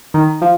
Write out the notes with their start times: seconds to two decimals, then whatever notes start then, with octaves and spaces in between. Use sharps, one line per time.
0.14 D#3
0.41 F3